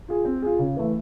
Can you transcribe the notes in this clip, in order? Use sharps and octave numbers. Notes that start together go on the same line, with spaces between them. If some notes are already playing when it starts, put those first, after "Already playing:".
F4 G#4
C4
F4 G#4
C#3
E3 A3